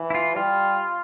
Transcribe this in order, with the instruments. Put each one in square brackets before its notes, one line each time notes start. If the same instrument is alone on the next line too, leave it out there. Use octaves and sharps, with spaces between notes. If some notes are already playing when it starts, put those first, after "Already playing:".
Already playing: [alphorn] E3
[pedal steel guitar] E4
F4
[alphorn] G3 [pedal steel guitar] F4